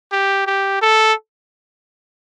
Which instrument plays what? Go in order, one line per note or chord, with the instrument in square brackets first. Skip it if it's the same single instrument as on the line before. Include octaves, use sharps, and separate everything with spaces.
[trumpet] G4
G4
A4